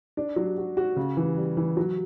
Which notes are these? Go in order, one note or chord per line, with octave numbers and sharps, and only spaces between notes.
D4
F#3
F#4
F#4
C#3
E3
G3
E3
F#3